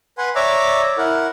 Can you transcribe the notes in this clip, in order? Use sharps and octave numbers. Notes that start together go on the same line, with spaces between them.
B4 F#5 G#5 C6
C#5 D5 E5 A#5 D6 E6
E4 A#4 F#5